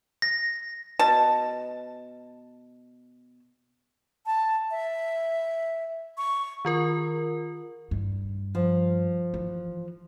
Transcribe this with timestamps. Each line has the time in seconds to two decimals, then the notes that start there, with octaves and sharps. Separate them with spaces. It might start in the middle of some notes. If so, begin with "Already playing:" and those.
0.22 A#6
0.99 B2 A5
4.26 A5
4.71 E5
6.18 C#6
6.65 D#3 F4 A#4
7.91 G2
8.55 F3
9.34 E3